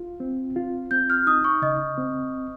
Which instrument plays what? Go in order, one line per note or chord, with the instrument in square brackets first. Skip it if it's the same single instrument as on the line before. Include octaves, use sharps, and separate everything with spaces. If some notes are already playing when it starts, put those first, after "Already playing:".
Already playing: [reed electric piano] F4
C4
F4
[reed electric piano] C4 [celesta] G6
[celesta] F6
[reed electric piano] D#4 [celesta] D#6
[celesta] C#6
[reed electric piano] C#3 [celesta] D#5
[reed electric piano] C4